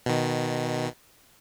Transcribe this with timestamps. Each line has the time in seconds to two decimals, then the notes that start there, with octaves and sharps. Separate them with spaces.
0.06 B2 D#3